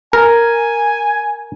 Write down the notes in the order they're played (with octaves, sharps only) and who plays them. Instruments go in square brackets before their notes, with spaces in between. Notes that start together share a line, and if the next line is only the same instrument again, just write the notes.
[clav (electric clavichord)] A#4 [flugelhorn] G#5